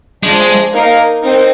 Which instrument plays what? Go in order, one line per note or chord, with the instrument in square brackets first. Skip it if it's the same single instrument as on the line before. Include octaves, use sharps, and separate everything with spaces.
[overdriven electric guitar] G#3 [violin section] D4 F4 C5
[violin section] A#3 D#4 A#4 F5
C4 D#4 A#4